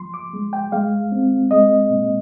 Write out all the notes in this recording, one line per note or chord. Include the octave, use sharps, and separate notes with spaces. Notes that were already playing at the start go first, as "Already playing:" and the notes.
Already playing: F3 C6
D6
G#3
G5
G#3 F5
C4
G#3 D#5
A#2